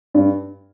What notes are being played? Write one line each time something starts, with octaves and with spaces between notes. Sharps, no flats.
G2